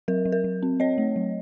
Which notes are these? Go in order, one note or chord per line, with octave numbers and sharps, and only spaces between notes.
F#3 A#4
F#3
A#4
F#3
C4
C4 C#5 D#5
A3
F#3